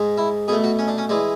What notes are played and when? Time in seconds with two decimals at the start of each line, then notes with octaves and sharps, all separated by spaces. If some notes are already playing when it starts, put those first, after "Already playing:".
Already playing: G#2 G#3
0.18 E4
0.48 B2 G#4
0.52 A3
0.64 F#4
0.79 C#4
0.88 D4
0.98 C#4
1.09 E3 G#3 D4